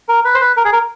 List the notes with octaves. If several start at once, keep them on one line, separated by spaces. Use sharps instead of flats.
A#4
B4
C5
B4
A#4
G#4
A#4